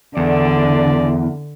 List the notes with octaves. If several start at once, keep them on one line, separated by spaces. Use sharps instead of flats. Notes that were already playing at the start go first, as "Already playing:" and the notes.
E2 D3 D5